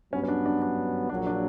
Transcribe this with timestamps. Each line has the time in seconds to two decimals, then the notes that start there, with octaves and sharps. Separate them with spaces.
0.13 G2 F#3 B3 C#4
0.23 C#4
0.28 D4
0.46 D4
0.62 D4
1.10 A#1 A#2 F#3 D4
1.27 D4